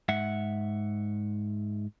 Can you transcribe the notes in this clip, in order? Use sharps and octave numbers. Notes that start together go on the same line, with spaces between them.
G#2 E5 F#5